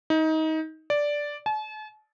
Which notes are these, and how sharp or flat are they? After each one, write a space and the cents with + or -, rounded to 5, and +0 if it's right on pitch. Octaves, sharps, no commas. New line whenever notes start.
D#4 +25
D5 -5
A5 -45